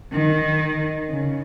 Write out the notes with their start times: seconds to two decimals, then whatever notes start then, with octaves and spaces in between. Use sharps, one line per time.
0.12 D#3
1.10 C#3